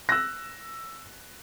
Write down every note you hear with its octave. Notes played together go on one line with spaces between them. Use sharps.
E6 F#6 A#6